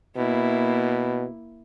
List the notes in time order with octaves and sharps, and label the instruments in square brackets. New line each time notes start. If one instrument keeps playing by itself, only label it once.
[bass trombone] B2 [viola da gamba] A#3 E4